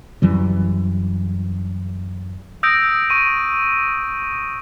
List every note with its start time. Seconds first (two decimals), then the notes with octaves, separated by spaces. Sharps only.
0.22 F#2 E3 G3
2.63 D#6 E6 G6 A#6 D7
3.10 C#6 D#7